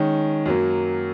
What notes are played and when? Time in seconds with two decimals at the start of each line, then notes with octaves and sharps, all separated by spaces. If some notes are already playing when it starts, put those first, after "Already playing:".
Already playing: D#3 G#3 C#4
0.46 F#2 F#3 A#3